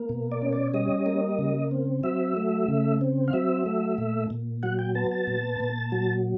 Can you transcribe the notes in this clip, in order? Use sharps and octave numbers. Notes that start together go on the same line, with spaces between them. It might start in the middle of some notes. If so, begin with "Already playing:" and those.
Already playing: A#3
B2
D5
C#4
D5
G3 D#5
A#3
C#3
C4
F#3 E5
A3
C#3
C4
F5
F#3 E5
A3
A#2
A#2
F#3 F#5
G5
B3 A5
A5
A#2
A#2
F#3